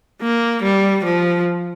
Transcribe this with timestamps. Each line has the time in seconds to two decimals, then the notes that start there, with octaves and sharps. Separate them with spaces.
0.21 A#3
0.63 G3
1.05 F3